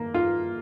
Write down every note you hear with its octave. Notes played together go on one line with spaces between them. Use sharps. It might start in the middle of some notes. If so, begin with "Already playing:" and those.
Already playing: A#3
F4